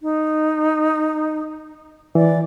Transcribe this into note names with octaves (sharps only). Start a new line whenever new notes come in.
D#4
E3 D5